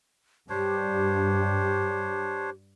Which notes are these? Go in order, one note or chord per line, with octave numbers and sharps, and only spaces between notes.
G2 D4 G4 C5 C#5